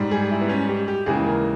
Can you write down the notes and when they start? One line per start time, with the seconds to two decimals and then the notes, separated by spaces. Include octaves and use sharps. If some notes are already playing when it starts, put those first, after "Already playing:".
Already playing: G#2 G3
0.11 G#4
0.31 E4
0.41 B3
0.49 C#4
0.69 G4
0.88 G4
1.06 D#2 C#3 E3 G#3 G#4
1.26 A#4